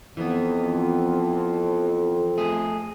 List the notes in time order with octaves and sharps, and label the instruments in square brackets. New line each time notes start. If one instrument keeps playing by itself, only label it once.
[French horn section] F2 [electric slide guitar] E3 B3
[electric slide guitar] A3 G#4